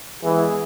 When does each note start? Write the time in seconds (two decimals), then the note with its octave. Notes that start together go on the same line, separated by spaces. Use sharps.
0.23 E3 G#3 B3 G#4